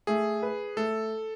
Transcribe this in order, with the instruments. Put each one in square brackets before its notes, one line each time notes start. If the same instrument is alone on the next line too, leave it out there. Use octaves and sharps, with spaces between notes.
[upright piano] A3 [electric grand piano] G#4
[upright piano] B4
[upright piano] A3 [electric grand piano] A4